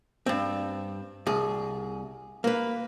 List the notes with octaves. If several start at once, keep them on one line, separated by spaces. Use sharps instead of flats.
G2 C4
C2 G#4
A#3 B4